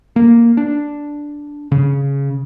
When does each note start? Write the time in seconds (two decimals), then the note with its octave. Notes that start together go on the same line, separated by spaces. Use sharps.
0.16 A#3
0.57 D4
1.72 C#3